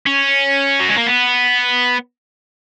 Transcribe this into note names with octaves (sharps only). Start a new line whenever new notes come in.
C#4
F#3
G#3
A#3
B3